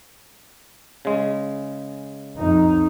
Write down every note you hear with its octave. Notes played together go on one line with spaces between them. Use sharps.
C#3 G#3
F2 D#4